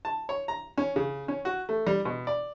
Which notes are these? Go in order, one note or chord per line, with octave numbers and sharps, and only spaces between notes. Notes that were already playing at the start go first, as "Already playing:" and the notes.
A5
C#5
A#5
C#4
C#3
C#4
F#4
A3
G3
B2
D5